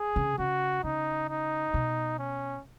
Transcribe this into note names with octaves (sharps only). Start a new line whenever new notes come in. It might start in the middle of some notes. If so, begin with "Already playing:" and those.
Already playing: G#4
C#3
C#3 F#4
C#3 D#4
D#4
B2
C#4